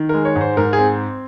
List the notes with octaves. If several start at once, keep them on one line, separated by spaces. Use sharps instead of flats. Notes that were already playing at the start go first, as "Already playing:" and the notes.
Already playing: D#3
G#3 A#4
C#5
G#2
C5
G#2 A#4
G#4
C4